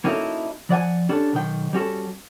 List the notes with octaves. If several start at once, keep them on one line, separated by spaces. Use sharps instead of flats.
A#3 C#4 D#4 E4 F#4 A4
F3 D5 F#5 G#5
C#4 D4 G4 A4
B1 D#3 G5
G3 C#4 F#4 A4